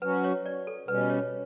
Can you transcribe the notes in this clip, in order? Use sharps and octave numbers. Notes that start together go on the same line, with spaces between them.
F#3 C#4 F#4 B4
C#5
D5
A4
B2 G3 C#4 B4
C#5